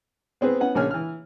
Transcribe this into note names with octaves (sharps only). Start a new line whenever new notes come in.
B3 C4 G#4 B4
B3 C#4 F#5
A#1 C#3 A#3 C#5 G#5 F6
E3 F6